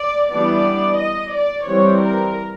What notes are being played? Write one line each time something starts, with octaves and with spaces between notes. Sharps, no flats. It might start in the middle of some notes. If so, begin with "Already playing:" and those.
Already playing: D5
E3 G3 B3 D4 D5
D#5
D5
E3 G3 C4 C#5
A#4